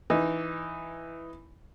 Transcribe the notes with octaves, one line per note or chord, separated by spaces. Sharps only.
E3 D#4